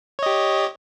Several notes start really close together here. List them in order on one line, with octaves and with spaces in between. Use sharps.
C#5 D#5 G4